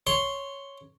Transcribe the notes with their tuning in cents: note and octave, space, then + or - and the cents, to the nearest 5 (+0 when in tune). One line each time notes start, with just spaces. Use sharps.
C#5 +0 C6 +0